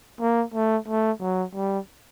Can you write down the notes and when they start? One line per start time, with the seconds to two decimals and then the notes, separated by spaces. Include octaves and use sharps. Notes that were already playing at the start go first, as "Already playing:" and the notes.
0.20 A#3
0.54 A3
0.88 A3
1.21 F#3
1.55 G3